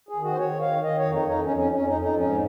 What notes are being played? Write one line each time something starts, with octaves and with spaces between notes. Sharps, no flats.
G#4
D#3
F#4
C5
D#3 C#5
D#3 F5
D#3 D#5
C#5
F2
D#4
F2 D#4
C#4
F2
C#4
F2 C#4
D#4
F2
D#4
G#2 C#4